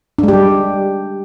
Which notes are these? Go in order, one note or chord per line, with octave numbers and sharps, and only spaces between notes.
G3 G#3 D4 G4